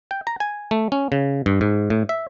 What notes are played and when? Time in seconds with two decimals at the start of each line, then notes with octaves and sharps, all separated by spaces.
0.11 G5
0.27 A#5
0.40 G#5
0.71 A3
0.92 C#4
1.12 C#3
1.46 G2
1.61 G#2
1.90 A2
2.09 E5